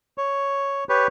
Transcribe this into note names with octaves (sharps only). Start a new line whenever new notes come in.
C#5
G4 B4 C#5